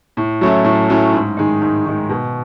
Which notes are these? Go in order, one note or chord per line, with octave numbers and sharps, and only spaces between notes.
A2
F#3 A3 C#4 E4
A2
F#3 A3 C#4 E4
G#2
D#3 G#3 D#4
G#2
D#3 G#3 D#4
B2